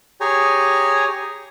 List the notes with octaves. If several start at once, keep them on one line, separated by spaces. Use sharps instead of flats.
G4 G#4 C#5 G#5 A#5